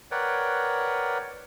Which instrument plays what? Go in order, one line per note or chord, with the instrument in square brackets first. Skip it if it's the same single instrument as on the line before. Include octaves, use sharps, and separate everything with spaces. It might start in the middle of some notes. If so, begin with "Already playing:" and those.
[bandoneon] A#4 B4 C#5 D5 F#5 G5